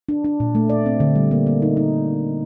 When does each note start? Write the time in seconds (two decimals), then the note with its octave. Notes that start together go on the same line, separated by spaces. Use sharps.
0.09 D4
0.24 D4
0.40 A#2
0.55 A3
0.70 D5
0.86 C4
1.00 D3
1.15 G3
1.31 A#3
1.47 A#3
1.62 D#4
1.77 D#4